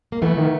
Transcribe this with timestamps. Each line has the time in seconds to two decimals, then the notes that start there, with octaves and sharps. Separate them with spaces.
0.12 A#3
0.22 E3 A3 B3
0.37 D#3